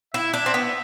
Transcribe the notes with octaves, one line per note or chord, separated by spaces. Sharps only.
E4 E5
D4
C4
B3